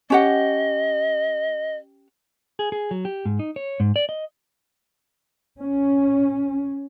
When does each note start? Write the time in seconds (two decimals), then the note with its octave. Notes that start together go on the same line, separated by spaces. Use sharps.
0.10 C#4 G4 D#5 F#5
2.59 G#4
2.72 G#4
2.91 F#3
3.05 G4
3.25 G#2
3.39 D#4
3.56 C#5
3.80 G#2
3.96 D5
4.09 D#5
5.60 C#4